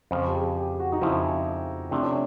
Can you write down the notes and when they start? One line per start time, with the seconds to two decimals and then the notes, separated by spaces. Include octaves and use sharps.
0.11 F2 C#3 F3 C5
0.27 G4
0.34 G#4
0.57 G4
0.80 F#4
0.92 D#4
1.01 F2 C#3 F3 E4
1.91 C3 F3 A3 C4 D4 E4
2.03 C#4